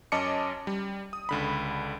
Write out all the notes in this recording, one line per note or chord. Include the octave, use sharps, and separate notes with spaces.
F#2 C#4 D#5 A5 D6 C#7
G3
D#6
C#2 D3 B5